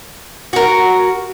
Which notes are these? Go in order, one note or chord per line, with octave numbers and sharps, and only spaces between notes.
F#4 A#4